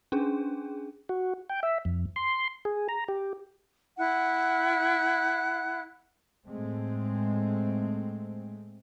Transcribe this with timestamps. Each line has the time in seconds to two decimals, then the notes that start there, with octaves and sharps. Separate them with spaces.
0.12 C#4 D4 G#4
1.09 F#4
1.49 G5
1.63 E5
1.85 F2
2.16 C6
2.65 G#4
2.89 A#5
3.08 G4
3.98 E4 F#5 F#6
6.48 A2 G#3 A3 C4